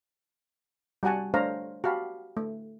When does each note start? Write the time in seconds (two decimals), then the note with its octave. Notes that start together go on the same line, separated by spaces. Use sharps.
1.03 G3 F#4 F#5 G#5 A5
1.34 A3 D4 C5 C#5 F5 A#5
1.84 F#4 G4 F5 A5 B5
2.37 A3